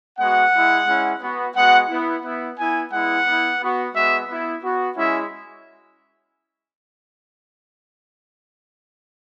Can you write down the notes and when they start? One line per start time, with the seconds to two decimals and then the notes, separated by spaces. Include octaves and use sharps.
0.18 G#3 B3 F#4 F#5
0.53 G#3 E4
0.87 G#3 C#4 E4
1.21 B3 F#4
1.55 G#3 B3 F#4 F#5
1.89 B3 E4
2.23 B3 E4
2.57 B3 E4 G#5
2.92 G#3 B3 E4 F#5
3.26 B3 E4
3.60 B3 F#4
3.94 G#3 B3 F#4 E5
4.28 B3 E4
4.63 B3 F#4
4.97 G#3 C#4 E4 E5